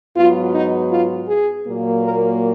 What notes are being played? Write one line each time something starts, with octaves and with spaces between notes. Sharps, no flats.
G#2 F#3 B3 F4
D#4
F4
G#4
A#2 F#3 A#3
A#4